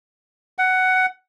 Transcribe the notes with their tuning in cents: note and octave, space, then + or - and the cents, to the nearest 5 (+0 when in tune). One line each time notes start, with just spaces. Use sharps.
F#5 +10